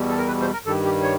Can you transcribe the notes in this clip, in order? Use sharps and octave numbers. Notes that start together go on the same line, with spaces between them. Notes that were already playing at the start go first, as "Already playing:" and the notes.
Already playing: E2 B2 G3
A4
A#4
B4
C5
A#4
G2 D#3 G3 A4
G4
C#5